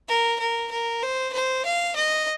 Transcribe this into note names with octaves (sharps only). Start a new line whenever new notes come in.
A#4
A#4
A#4
C5
C5
F5
D#5